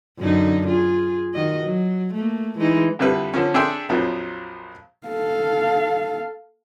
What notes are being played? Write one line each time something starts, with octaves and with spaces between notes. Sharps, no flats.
F#2 D3 D#4
F4 G#4
D#3 F#4 D#5
F#3
A3 A#3
E3 G#3 D#4
F2 D3 G3 E4 B4
D3 F3 C#4
D4 G#4 A4 E5 G5 C6
A#1 F2 F3 F#3
A4 F5